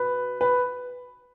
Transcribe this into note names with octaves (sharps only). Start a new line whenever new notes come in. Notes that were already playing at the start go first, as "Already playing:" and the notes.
Already playing: B2 B4
B4